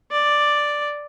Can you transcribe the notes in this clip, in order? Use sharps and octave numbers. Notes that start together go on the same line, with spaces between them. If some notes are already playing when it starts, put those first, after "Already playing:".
D5